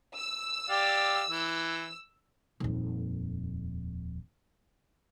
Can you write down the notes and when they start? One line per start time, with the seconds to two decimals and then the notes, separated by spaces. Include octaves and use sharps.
0.16 E6
0.69 G4 D5 F5
1.30 E3
2.60 D#1 F2